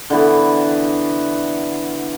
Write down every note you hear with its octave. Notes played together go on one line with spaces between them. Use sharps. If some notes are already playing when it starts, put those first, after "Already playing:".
D3 E3 B3